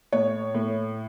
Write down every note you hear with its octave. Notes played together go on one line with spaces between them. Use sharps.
A2 C#5
A2